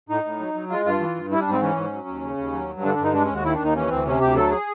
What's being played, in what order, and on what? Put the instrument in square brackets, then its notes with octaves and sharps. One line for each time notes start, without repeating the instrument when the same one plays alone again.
[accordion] A2 D#4
A2
F#3
F#3
G#3 F4
G2 F4
E3
G2
G3 E4
D4
G#2
C4
E3 C#4
G#2
F#3
D#2
C#3
D#2
F#3
G2
D3 D4
G2 D4
D#4
G#3 D4
D#2 C#4
F#4
D#3 E4
D4
D#2
D#4
E3 C#4
D2 C4
C3 C#4
D2 G4
F#3 A4
G#4